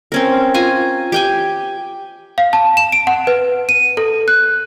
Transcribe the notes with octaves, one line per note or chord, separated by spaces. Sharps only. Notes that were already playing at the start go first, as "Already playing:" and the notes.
C4 C#4 A#4
F4 G#5 A#5
G4 G5 G#5
F5
A5
E7
D7
F#5
B4
D#7
A4
F#6